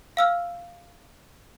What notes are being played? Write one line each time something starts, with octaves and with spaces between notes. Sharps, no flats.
F5 E6 F6